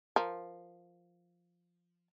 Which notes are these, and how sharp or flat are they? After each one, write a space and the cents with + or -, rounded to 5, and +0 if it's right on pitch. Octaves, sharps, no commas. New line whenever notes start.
F3 +0 A#4 +0